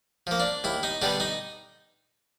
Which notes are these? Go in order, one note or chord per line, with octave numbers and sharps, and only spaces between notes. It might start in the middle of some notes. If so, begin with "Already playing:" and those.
F3 A#3
D4
D#2 E4
D#4
D3 G3 B3 D4
D#4